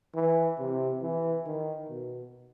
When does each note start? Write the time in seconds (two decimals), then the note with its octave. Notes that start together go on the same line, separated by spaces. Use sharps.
0.15 E3
0.59 C3
1.02 E3
1.46 D#3
1.89 B2